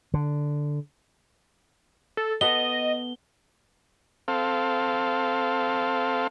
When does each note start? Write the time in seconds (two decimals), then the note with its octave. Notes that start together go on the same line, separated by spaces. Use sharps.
0.14 D3
2.17 A4
2.41 B3 A4 D#5 G7
4.28 C4 A4 F5